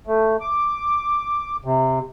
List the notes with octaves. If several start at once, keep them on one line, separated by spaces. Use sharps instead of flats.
A3
D6
C3